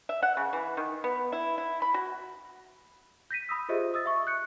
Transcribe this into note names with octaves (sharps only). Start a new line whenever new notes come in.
E5
F#5
C#3
E3
D#3
B3
E4
E4
B5
F#4
G6 A#6 B6 D#7
B5 D#6 E6
F4 G4 G#4 C5 D#5 E5
D#6 E6 A6
E5 C#6
F#6 G6 C#7